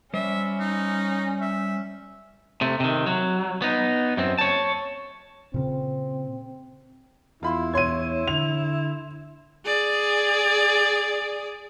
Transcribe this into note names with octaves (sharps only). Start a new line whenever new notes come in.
G3 C#4 C5 E5
D#4
E5
C3 A3
C3 D#3
F#3
B3 D#4
F#2 C4
C#5 A5
A#2 C#3 C4
E2 E4 F4 B5 C6
C#5 C6 G#6 D#7
D3 F7
G#4 D5